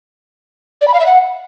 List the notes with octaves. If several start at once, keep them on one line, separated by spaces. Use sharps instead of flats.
D5
B5
F5
E5
F#5